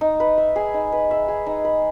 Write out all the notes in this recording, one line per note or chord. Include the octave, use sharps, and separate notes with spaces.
D#4
B4
E5
G#4
D#4
B4
E5
G#4
D#4
B4